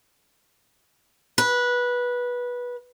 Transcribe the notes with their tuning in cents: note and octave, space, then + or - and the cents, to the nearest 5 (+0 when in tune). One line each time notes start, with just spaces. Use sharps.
B4 -15